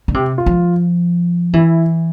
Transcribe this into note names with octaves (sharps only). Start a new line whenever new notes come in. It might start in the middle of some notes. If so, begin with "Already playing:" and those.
D3
C3 G4
F4
F3
E3 E4